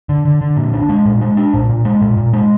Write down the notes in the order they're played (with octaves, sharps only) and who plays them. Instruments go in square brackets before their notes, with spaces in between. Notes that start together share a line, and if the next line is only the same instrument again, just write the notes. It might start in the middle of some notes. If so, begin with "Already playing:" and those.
[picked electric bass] D3
D3
D3
A#2
D4
G#3
A#2
G#3
D4
A#2
A#2
G#3
A#2
A#2
G#3